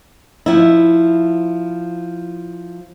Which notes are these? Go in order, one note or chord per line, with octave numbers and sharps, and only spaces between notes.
F3 E4